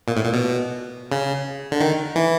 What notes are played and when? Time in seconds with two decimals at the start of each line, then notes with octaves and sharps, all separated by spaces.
0.08 A#2
0.16 A2
0.24 A#2
0.33 B2
1.12 C#3
1.72 D3
1.81 D#3
2.16 E3